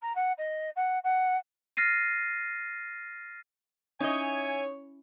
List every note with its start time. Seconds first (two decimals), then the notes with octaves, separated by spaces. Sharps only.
0.02 A#5
0.15 F#5
0.37 D#5
0.76 F#5
1.04 F#5
1.77 F6 A6 A#6 C7 D#7
4.00 C#4 D#4 E4 C#5 D#5 E5 G#5